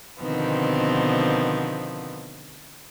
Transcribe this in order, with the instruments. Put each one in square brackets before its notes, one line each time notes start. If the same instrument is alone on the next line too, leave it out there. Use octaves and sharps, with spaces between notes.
[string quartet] B2 D3 D#3 F3 B3 C4